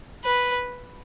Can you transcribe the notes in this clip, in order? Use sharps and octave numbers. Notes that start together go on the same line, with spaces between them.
B4